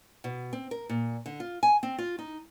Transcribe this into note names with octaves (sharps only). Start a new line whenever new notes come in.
B2
C4
A#4
A#2
D3
F4
G#5
C4
F4
D#4